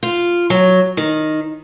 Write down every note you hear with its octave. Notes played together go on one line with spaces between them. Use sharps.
F4
F#3
D#3